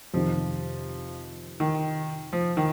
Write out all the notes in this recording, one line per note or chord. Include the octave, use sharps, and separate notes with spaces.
F2 C3 D#3 F3
D#3
F3
D#3